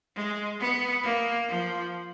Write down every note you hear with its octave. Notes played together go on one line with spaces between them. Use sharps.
G#3
B3
A#3
F3